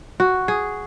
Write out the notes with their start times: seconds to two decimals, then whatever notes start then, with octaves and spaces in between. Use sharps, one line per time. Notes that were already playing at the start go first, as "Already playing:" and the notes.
0.20 F#4
0.48 G#4